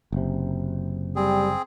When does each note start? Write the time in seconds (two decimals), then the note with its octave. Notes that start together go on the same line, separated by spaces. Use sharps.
0.12 F#1 C3
1.16 G3 C4 G#4